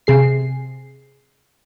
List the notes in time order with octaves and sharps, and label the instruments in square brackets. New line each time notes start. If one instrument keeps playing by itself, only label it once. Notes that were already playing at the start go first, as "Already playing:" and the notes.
[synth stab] C3 G#4 C7